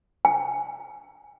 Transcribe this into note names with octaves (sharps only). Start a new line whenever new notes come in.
G#5